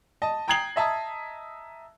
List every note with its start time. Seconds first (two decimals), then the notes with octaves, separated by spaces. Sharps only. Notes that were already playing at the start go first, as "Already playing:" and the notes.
0.22 D#5 A5
0.48 G5 A#5 D#6 G#6 C7 F#7
0.76 D#5 E5 A5 A#5 D#6